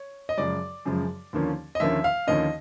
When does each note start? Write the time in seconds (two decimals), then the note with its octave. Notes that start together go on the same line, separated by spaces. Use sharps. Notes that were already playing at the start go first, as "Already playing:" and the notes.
Already playing: C#5
0.29 D#5
0.37 F#2 C#3 F3 G#3 D5
0.85 F#2 C#3 F3 G#3
1.33 D#2 D3 F3 A#3 C#4
1.75 D#5
1.80 D#2 D3 F3 A#3 C#4 E5
2.04 F5
2.27 D#2 D3 F3 A#3 C#4 D#5